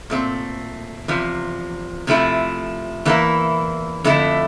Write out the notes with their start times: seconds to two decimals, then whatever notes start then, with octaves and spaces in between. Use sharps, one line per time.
0.10 A#2 A3 C4
1.08 E2 C3 F3
2.07 C3 F3 A3 E4
3.05 E2 E3 A#3 E4
4.04 F2 D3 A3 E4